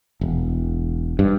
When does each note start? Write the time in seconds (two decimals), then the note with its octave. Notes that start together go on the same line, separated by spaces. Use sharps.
0.21 E1
1.19 G2